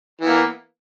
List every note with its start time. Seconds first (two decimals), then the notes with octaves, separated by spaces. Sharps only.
0.21 E3
0.25 B3
0.28 A#3